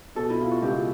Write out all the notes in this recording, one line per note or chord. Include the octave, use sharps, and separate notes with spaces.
B2 A4
E4
B2 F4
F#4
C#2 G4